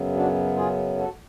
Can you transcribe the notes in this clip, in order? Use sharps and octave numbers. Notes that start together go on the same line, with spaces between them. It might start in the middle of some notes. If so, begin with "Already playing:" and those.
Already playing: F#2 C#3 F#3 B3
D4 F#4
F4 G#4
F#4 A4